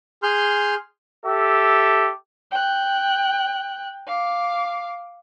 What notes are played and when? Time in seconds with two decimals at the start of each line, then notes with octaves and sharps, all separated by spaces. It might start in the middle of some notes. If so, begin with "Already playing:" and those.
0.23 G#4 C6 F6 G6
1.25 G4 A4 E5
2.51 G5 F#6
4.07 F5 D6